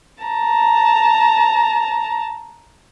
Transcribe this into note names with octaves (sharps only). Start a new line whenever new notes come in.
A5 A#5